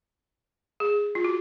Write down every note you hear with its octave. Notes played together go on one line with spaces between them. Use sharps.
G#4
F4
F#4